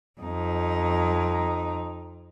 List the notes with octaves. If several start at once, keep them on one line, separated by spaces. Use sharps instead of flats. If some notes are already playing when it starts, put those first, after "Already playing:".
F2 D#4